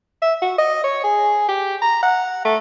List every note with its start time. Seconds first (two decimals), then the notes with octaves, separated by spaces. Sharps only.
0.22 E5
0.42 F#4
0.58 D#5
0.84 C#5
1.04 G#4
1.49 G4
1.82 A#5
2.03 F#5
2.45 A3